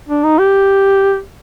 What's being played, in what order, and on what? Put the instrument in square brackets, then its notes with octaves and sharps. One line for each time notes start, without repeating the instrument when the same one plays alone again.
[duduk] D4
D#4
G4